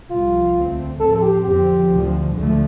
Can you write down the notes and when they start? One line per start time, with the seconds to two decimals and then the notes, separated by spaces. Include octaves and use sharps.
0.10 C2 C3 F3 F4
0.56 D2 D3 A3 C4
1.00 A2 F3 C4 A4
1.12 A4
1.22 G4
1.45 F2 D3 F3 C4 G4
1.90 D2 D3 F3
2.35 D2 D3 F3 A3